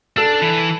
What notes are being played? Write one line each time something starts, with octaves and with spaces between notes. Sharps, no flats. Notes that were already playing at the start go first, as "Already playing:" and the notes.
D4 A4
E3